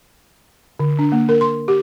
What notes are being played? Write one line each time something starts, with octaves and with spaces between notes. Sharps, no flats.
D3
D4
A#3
A#4
C6
G4